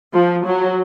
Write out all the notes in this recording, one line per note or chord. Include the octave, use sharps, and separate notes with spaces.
F3
F#3